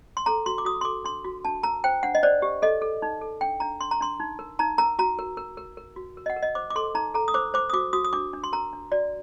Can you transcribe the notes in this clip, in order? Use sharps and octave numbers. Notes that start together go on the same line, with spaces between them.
C6
A4 A#5
F#4 C6
D6
F#4 D#6
C6
A4 D6
D4 C6
F#4
D4 A5
A#4 A#5
C5 G5
D4 F#5
D#5
C5 D5
G4
A4 D#5
A4
D#4
A4
D4 G5
D4 A#5
D4 C6
A#5
D4 C6
D#4
A#4
D#4 A#5
A#4 A#5
F#4 A#5
A#4
A#4
A#4
A#4
F#4
A#4
D#5
F#5
A#4
D#5
C5 D6
D6
A4 C6
D#4 A#5
A4 A#5
D#6
C5 D6
C5 D6
D#6
F#4 D6
F#4 D#6
D#6
D4 D6
D4
C6
A#4 A#5
D4
F#4 D5